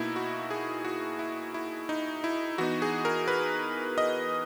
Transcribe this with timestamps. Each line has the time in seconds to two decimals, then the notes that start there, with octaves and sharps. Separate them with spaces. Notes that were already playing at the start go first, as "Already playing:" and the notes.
Already playing: B2 A#3 D#4 E4
0.16 F#4
0.51 G#4
0.85 F#4
1.19 E4
1.54 E4
1.89 D#4
2.24 E4
2.58 E3 B3 D#4 F#4
2.82 G#4
3.05 A#4
3.28 B4
3.98 D#5